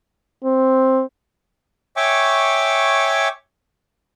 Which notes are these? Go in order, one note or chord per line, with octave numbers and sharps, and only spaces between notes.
C4
C#5 E5 G5 G#5 C#6 D6